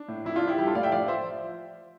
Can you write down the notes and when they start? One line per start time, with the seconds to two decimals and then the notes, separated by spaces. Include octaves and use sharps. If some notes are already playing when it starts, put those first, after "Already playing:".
Already playing: D4
0.08 A2
0.25 F2 E4
0.36 D4 F4
0.41 F3
0.47 E4 G4
0.58 G3 E4 G4
0.66 F4 A4
0.75 A2 D5 F5
0.83 E5 G5
0.92 F3 D5 F5
1.08 F3 C5 E5